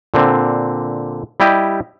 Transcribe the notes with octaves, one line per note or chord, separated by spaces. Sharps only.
A#2 D3 C4
G3 E4 G4 D#5